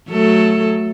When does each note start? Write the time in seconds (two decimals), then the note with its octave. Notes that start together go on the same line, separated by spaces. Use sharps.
0.10 F#3 A3 A4